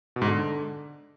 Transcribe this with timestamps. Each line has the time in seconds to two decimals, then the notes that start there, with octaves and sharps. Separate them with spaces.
0.16 B2
0.22 G#2
0.27 D3